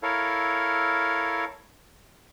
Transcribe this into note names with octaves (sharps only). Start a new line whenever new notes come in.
E4 A4 A#4 C#5 F5